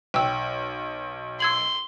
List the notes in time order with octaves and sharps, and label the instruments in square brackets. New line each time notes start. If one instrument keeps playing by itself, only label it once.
[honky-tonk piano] B1 [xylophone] G5 E6
[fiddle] C6 [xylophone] E6 G#6 F#7